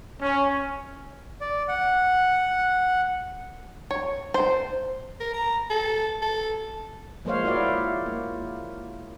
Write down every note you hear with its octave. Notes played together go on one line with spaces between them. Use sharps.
C#4
D5
F#5
C#5
C5
A#4
A#5
A4
A4
F3 G#3 A#3 C5 C#5 F5
A#3 E4 F#4 C#5 D5 F5
A#3